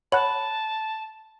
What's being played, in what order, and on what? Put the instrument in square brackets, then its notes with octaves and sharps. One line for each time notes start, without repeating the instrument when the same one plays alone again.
[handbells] C#5 F#5 F#6 [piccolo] A5 [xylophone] B5